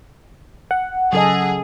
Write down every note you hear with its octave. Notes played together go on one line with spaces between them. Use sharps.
F#5
C#3 F#3 G#4 A4 D#5